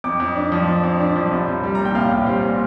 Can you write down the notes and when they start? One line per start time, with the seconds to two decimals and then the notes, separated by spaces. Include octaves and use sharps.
0.04 F2 D6
0.20 F2
0.35 D4
0.52 F3
0.68 F2 C6
0.84 F2
1.00 D4
1.16 F3
1.31 C2
1.48 C2
1.63 G3
1.75 A#2 A#5
1.85 G5
1.95 C2 F5
2.11 C2
2.27 G3 C5
2.43 A#2